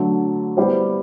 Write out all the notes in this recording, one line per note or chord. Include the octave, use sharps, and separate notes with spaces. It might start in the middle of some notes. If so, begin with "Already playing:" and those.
Already playing: D3 F#3 A3
G3 B3 E4 G4 C5